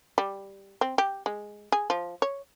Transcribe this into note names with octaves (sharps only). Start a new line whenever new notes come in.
G3
C4
G4
G#3
G#4
F3
C#5